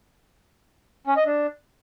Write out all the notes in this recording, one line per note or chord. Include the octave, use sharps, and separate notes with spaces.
C#4
D#5
D4